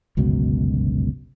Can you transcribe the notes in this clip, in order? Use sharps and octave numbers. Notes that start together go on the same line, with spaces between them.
G1 C#2 F#2 B2